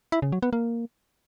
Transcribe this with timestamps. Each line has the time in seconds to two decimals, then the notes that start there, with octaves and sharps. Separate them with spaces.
0.12 E4
0.22 C#3
0.32 F#3
0.43 B3
0.53 A#3